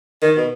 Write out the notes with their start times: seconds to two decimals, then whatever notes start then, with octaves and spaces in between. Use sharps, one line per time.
0.22 D#3
0.36 B2